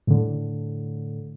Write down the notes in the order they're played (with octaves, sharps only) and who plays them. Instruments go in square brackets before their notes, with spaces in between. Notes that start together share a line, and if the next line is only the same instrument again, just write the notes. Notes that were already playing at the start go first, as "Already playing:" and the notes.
[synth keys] A2 D3